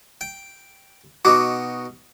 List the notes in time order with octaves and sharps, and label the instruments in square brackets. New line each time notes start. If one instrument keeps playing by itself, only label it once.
[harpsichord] G5
[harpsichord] B2 D#4 F#4 [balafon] C#6 D6